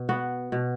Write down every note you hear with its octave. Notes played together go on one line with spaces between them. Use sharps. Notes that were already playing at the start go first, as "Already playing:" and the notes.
Already playing: B2
B3 F#4
B2